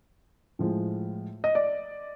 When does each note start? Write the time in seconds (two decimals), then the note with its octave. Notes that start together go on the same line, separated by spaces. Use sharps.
0.59 A2 F3 G#3
1.44 D#5
1.55 D5